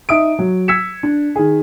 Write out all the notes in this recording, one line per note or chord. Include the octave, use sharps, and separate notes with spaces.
D#4 E5 D#6 D7
F#3
E6 G#6 B6 C#7 E7
D4
D#3 G#4